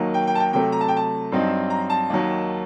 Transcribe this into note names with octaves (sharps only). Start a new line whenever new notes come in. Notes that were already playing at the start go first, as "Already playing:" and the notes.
Already playing: D#2 D#3 F#3 A#3
G5
G5
A5
G5
C3 F#3 A3 G5
A#5
A5
G5
A5
G2 F#3 C4 D#4
A#5
A5
D#2 D#3 F#3